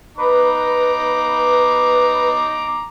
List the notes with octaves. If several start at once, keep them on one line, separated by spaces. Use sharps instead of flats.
D#4 B4 A#5 D6